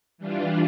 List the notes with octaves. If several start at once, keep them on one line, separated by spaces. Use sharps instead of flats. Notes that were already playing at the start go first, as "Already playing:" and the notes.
E3 G3 D4 F4